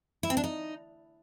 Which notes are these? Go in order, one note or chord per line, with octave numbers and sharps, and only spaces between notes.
E4
C4
D4
D#4